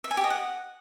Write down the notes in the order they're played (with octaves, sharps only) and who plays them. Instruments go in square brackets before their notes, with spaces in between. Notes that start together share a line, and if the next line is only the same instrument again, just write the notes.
[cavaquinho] E5
G#5
G4
D#5
F#5